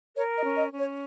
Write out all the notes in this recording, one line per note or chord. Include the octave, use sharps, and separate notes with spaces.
A#4 C#5
D#5
C#4
D#5
C#4
C#5